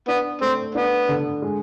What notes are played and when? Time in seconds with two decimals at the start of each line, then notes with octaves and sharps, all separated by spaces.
0.08 B3 D4
0.41 A3 C4
0.75 B3 D4
1.09 D3
1.42 G#3